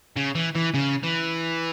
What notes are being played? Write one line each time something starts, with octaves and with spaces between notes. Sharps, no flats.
C#3
E3
E3
C#3
E3